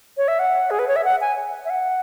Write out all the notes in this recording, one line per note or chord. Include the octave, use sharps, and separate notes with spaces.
C#5
E5
F#5
G#4
B4
C#5
E5
F#5
G#5
E5
F#5